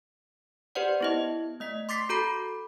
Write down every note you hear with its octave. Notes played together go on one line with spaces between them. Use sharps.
G4 B4 C5 D5 F#5
B3 E4 D#5
A3 D#5 B6
C6 D6 A6 B6 C7
F#4 A4 A#5 B5 D6